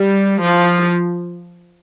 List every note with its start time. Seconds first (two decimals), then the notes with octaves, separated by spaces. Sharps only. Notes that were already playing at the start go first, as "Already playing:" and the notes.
Already playing: G3
0.41 F3